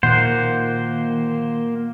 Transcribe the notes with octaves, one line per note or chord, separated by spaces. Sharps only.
A#2 D#3 A#3 C5 F#5